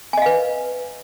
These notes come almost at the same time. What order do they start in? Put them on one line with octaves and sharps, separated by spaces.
G#5 D#5 F5 B4